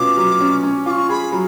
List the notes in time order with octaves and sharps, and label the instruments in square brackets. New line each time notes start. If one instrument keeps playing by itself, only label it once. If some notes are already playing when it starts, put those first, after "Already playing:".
Already playing: [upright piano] B2 C#4 F4 [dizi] D6
[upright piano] F#3
C#4
C#4
[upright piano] F4 [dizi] D6
[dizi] C#6
[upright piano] G#4 [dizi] B5
[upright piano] F#3